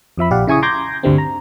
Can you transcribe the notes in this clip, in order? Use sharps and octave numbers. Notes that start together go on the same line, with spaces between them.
F2 F3 E5 B5
A#1 G4 D5 F5 F#5
C#3 E4 G#5 C#6 D#6
A#5 C6 D6 G6 G#6 A#6
D2 G2 D3 G3 A3 C4
A#5